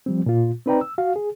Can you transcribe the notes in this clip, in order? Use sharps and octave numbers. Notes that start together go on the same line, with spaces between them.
F3 G3 C4
A#2 F4
C4 D#4 B4 D5 G5 A#5
E6
F#4 F5
G#4